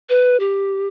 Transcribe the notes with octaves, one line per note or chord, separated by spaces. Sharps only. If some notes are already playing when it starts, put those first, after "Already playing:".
B4
G4